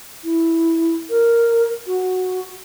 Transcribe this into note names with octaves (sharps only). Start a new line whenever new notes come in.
E4
A#4
F#4